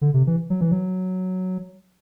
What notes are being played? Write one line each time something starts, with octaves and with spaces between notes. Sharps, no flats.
D3
C3
E3
F#3
E3
F#3